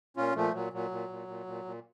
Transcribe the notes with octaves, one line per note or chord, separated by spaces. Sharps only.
A#2 C#4 F4
A#2 F3 A3
A#2 F#3
A#2 F#3
A#2
A#2
A#2
A#2
A#2